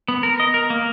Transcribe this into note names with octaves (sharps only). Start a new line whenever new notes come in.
B3
A#4
D#5
A#4
A#3